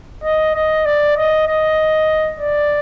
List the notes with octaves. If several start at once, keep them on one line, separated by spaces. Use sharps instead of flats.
D#5
D#5
D5
D#5
D#5
D5